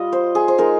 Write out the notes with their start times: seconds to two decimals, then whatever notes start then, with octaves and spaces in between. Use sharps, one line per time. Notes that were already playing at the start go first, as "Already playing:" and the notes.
Already playing: G3 F4 D#5
0.13 C5
0.35 G#4
0.48 C5
0.58 G#3 D#4 A#4